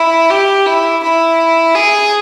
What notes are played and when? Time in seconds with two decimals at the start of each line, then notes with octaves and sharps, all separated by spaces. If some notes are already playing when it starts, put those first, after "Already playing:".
Already playing: E4
0.30 G4
0.66 E4
1.03 E4
1.74 G#4